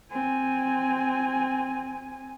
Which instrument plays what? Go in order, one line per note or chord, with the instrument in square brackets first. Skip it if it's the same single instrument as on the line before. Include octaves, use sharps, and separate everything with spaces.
[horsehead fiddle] C4 G#5